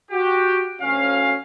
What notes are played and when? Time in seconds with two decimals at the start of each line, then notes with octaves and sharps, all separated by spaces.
0.11 F#4 G4
0.81 D2 C#4 F5